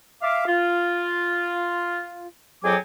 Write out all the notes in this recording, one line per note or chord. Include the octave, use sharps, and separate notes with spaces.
E5 F5 D6
F4
F2 F#3 G#4 G5 G#5 D6